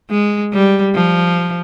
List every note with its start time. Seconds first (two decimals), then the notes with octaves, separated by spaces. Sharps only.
0.10 G#3
0.53 G3
0.95 F3